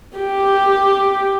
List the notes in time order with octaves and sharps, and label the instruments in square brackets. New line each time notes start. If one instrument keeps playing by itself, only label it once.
[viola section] G4